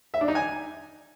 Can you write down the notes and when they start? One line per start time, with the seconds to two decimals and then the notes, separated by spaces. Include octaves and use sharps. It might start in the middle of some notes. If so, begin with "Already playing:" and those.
0.14 E5
0.21 D4
0.28 D#4
0.35 G#5